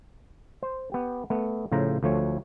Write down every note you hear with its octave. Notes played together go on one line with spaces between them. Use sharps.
C5
B3 G4
A3 B3
A2 C#3 F3 C5 A#5
D2 F3 A3 C#5